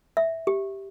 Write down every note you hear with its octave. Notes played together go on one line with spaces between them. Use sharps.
E5
G4